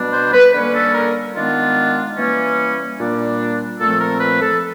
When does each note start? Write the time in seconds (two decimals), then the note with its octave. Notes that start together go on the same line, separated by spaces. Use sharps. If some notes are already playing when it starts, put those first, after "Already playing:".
Already playing: B2 G3 B3 D4
0.13 C5
0.34 B4
0.54 D3 G3 A#3 C#4 B4
0.74 A4
0.94 A#4
1.36 D#3 G#3 B3 D4 F4
2.17 E3 G3 A#3 C#4
2.99 A#2 G3 A#3 D4
3.80 A#2 F3 A3 C4 A4
4.01 A#4
4.20 B4
4.41 A4